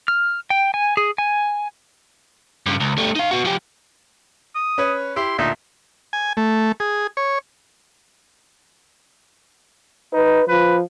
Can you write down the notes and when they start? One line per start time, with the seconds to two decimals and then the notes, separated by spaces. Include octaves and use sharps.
0.08 F6
0.50 G5
0.74 G#5
0.97 G#4
1.18 G#5
2.66 G2 C#3
2.80 C#2
2.98 G3 A3
3.16 D#4 F5
3.31 B3 F#4
3.45 F3 G4
4.55 D#6
4.78 C#4 B4 C#5
5.16 E4 G4 C6
5.38 D2 A#2 D#4 E5
6.13 G#5
6.37 A3
6.80 G#4
7.17 C#5
10.13 D#4 B4
10.48 F3 B4